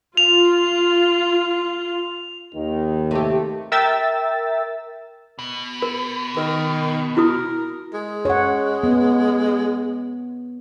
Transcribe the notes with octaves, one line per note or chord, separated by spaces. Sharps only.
F4 F7
D#2 D#3
C3 A3 G4
A#4 E5 G5 E6 A6
B2
A#4
D#3 A#4
E4 F#4 A#4 D#6
G#3
C#5 F#5
B3